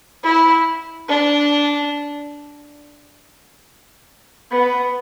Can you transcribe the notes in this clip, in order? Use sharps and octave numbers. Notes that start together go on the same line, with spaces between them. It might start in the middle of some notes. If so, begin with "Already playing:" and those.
E4
D4
B3